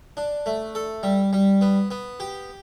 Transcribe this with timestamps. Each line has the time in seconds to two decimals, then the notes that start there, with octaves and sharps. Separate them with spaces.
0.17 D4
0.46 A3
0.75 A4
1.03 G3
1.33 G3
1.61 B3
1.91 B3
2.20 G4